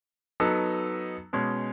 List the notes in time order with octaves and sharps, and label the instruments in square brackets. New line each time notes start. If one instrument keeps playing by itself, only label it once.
[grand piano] F#3 B3 D#4 A4
B2 G#3 C#4